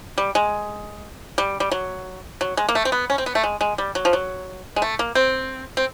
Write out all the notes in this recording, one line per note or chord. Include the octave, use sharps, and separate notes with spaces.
G3
G#3
G3
G3
F#3
F#3
G#3
A#3
A3
C4
B3
C#4
C4
B3
A3
G#3
G#3
G3
F#3
F3
F#3
G#3
A3
A#3
C4
C4